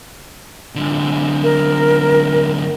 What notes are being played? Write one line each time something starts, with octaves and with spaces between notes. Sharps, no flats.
F#2 D3
A#4